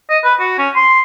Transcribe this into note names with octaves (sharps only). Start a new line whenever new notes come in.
D#5
B4
F#4
C#4
C6